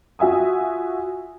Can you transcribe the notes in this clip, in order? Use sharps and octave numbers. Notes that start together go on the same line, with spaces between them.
F4 F#4 E5 G#5 D#6